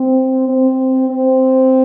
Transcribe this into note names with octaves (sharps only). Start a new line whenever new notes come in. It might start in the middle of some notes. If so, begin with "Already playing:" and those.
Already playing: C4
C4
C4